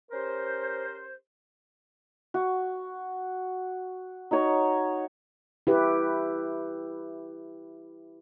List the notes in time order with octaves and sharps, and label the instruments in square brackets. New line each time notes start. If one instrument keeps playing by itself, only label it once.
[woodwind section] C#4 G4 A#4 C5
[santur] F#4
D#4 F#4 C#5 D#5
[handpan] E4 G4 B4